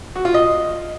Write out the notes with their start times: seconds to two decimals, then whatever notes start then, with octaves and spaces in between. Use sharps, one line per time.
0.15 F#4
0.25 F4
0.34 D#5